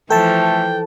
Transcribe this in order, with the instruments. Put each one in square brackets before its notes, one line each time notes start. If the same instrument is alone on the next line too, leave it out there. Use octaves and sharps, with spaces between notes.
[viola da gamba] E3 F3 [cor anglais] A3 [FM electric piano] A4 A5 [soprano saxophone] G5